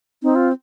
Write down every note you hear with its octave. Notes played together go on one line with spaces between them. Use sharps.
C4 D#4
F4